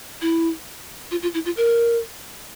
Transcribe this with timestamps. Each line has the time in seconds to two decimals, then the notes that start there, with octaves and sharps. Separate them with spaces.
0.22 E4
1.11 F4
1.23 F4
1.34 E4
1.45 F4
1.57 A#4